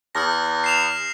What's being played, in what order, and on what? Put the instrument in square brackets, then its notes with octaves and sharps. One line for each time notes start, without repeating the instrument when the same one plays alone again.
[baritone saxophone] E2 [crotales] D#6 F6 A#6
[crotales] C7 E7 F7